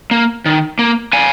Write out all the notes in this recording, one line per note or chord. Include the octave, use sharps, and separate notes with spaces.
A#3
D#3
A#3
D3 F5 G#5